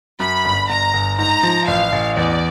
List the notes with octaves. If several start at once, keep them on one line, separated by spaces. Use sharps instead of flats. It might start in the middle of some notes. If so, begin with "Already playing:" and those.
F#2 B5
G1
G1 A#5
G1
G#2 A#5
F3
A1 F5
A1
E2 D5